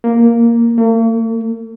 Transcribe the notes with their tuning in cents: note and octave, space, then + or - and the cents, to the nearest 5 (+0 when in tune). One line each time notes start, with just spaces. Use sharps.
A#3 +0
A#3 -45